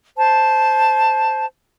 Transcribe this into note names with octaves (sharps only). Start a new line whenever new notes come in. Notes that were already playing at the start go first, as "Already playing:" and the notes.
C5 A5